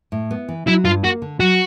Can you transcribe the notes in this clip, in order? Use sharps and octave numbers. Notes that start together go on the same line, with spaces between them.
A2
B3
E3
F#3 E4
G2 F4
A#3 F#4
D3
F#3 F#4